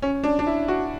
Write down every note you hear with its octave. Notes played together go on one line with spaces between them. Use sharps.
C#4
D4
D4
E4
F#4